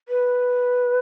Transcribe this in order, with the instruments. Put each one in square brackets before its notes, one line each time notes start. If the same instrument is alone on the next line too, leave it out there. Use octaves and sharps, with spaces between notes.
[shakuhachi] B4